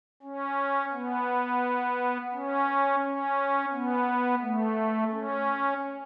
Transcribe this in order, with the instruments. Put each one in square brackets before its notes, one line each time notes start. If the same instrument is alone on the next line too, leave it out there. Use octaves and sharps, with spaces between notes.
[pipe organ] C#4
B3
C#4
C#4
B3
A3
C#4